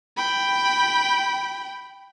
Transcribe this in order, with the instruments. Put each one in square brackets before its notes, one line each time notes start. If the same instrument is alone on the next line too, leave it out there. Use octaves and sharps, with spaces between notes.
[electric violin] G5 B5